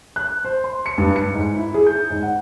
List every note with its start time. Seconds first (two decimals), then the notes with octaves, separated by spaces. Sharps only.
0.16 F#6
0.45 C5
0.64 C6
0.86 C#7
0.98 G2
1.16 C#7
1.34 G#2
1.56 E4
1.74 G#4
1.87 G6
2.10 G#2
2.23 F#5